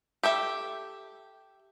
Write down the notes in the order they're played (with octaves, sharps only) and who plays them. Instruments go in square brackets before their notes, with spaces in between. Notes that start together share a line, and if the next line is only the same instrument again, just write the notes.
[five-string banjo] G4 A4 E5 G5